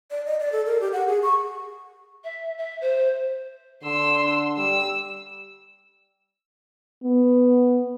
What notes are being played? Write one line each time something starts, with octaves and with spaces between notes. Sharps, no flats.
D5
D#5
D5
A4
A#4
G4
F#5
G#4
C#6
E5
E5
C5
D3 C6 E6
G3 E6
B3